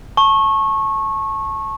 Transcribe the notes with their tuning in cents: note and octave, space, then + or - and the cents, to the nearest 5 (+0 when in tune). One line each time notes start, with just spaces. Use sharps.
A5 +0 C#6 -20